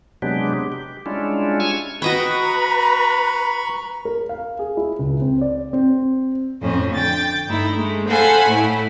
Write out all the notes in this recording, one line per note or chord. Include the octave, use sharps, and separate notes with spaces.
C3 F#3 G#3 B3 D4 G4
G4
G3 G#3 C#4 D4 E4 F4
G#5 C#6 E6 F6 G#6
F#4 B4 D#5 G5 A#5 B5 C#6
A#4
F5
G#4
E4
C#2
C4
D5
C4
F2 A2 C#4 C5
D3 G5 A6
G2 A3 D#4 E4
G#3 A3
A4 C5 F5 F#5 G#5 B5
A2 A3 E4